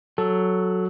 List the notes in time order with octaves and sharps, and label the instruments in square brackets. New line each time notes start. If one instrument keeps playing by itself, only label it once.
[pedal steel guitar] F#3 [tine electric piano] A4